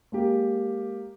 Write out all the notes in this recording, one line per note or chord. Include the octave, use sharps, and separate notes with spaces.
G#3 A#3 G4